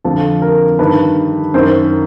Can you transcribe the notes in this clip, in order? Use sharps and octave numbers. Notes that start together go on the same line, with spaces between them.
F2 D3 F3 A4
A#4
G2 D#3 B4
F#2 D#3 C5